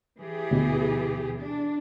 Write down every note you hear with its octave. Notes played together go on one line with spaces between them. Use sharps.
E3 G4 G#4
D2 B2
D4